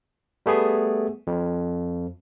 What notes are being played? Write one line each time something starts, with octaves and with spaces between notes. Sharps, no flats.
G3 A3 B3 G#4
F2